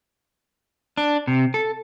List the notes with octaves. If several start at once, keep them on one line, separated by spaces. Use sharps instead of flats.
D4
C3
A4